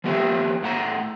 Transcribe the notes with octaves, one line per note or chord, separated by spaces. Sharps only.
F3 A#3 G4 D#5 E5
A2 F#5 A#5